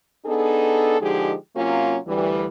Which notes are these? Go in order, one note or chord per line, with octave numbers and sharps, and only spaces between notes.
B3 D4 D#4 G#4 A4
D3 F3 G#3 D#4 G4 G#4
C3 F#3 A#3 C#4 F4
D2 E3 G3